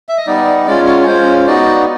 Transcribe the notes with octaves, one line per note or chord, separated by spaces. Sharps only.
E5
D#5
G3 B3 D#4 D5
G#3 C#4 F4 D5
C#5
C#5
G#3 C#4 F4 C5
B3 D#4 F#4 D5